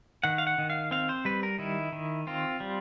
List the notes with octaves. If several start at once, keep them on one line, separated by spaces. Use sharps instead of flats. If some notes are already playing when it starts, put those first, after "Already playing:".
D#3 F#5
F5
F#5
D#3
F5
C4 F5
C5
G3 B4
A#4
D#3 E4
D#3
C4 F4
G3